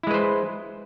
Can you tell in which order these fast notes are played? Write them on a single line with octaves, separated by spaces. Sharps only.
E4 G#3 B4 C5